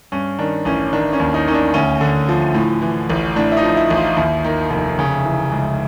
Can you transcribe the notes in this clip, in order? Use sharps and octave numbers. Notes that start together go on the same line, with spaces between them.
G2 C#4
D#3 D4
A1 C#4
D#3 D4
C#4
D#2
D#4
D#3 C#4
D4
D2 C#4
D3
F3
A2
E3
A1
A2 D4
E4
D#4
F3
E4
A1
F4
D#2 E4
D#3
F1
C#3
E3
C#2